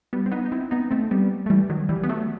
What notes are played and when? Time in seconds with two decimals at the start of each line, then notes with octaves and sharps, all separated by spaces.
0.13 G3 B3
0.26 C4
0.31 B3 D#4
0.46 D#4
0.52 C4 E4
0.71 B3 D#4
0.91 A3 C4
1.11 G3 B3
1.46 A3
1.50 E3 G3
1.70 D#3 F#3
1.89 E3 G3
2.03 B3
2.09 F#3 A3